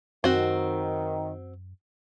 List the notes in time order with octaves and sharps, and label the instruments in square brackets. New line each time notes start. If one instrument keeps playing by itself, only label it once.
[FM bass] F#2 [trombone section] D#3 [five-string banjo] C4 F#4